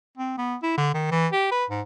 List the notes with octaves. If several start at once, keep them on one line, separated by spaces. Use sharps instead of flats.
C4
B3
E4
D3
D#3
E3
G4
B4
G#2